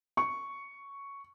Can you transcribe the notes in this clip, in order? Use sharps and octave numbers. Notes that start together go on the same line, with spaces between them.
C#6